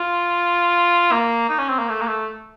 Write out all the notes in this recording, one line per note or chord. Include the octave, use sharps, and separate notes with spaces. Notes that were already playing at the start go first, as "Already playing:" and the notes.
Already playing: F4
A#3
D#4
C#4
C4
A#3
A3
A#3
A3